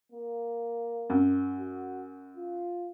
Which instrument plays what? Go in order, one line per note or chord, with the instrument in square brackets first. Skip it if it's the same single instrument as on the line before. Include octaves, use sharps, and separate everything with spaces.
[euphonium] A#3
[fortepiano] F#2
[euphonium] F#4
F4